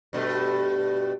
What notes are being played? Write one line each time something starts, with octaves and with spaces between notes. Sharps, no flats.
G2 B2 A3